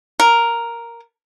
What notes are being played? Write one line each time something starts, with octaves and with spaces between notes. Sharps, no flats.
A#4